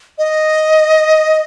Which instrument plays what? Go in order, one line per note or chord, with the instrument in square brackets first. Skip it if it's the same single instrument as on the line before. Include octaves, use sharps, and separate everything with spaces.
[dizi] D#5